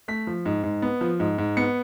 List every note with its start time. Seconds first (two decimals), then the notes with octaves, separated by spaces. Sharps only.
0.08 A3 B6
0.27 F3
0.46 G#2
0.63 G#2
0.82 B3
1.01 F3
1.20 G#2
1.38 G#2
1.57 B3 C#7